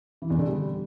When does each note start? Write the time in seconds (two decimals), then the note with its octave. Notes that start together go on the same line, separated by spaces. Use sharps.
0.22 E3
0.30 E2
0.39 D3
0.47 G3